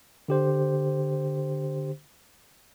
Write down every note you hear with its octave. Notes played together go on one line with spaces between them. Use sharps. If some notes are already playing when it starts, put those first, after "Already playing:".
D3 G4 C5